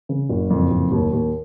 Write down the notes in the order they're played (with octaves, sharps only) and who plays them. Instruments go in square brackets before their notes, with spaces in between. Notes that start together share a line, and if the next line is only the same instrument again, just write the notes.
[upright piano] C#3
F#1
F2
F#1
D#2
D#2